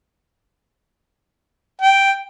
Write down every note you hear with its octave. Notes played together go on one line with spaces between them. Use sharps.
G5